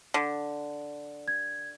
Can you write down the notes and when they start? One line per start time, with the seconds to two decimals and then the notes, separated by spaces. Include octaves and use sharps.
0.14 D3
1.28 G#6